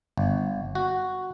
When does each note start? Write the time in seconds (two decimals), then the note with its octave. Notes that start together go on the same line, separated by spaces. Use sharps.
0.17 G1
0.75 F#4